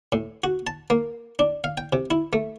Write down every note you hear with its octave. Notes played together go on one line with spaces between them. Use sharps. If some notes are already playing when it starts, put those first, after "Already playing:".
A2
F#4
A5
A#3
D4
F5
G5
C3
E4
A3